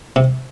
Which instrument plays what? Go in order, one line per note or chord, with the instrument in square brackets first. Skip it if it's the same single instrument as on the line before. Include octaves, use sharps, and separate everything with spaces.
[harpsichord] C3